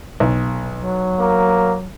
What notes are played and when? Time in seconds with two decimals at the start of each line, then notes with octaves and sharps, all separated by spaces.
0.20 B1
0.75 F#3
1.20 A#3